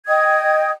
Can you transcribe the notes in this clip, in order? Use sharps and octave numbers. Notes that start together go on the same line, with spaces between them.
D#5 G5 D#6 G#6